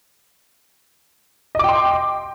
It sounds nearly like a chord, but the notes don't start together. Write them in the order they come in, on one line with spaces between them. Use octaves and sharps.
D#5 D6 G5 C6